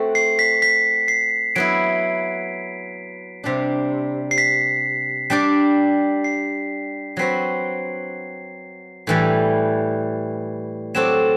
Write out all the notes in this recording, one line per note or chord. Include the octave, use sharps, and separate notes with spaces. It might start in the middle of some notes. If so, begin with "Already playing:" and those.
Already playing: A3 C4 F#4
C7
B6
B6
C7
F#3 B3 E4 D7
C3 G3 D4
C7
B6
G3 D4 G4 D5
C7
F#3 C4 F#4 B4 C7
A2 E3 G3
F#3 C4 F#4 A4 D5 E7